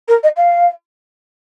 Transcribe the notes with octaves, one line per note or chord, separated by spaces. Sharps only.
A#4
D#5
F5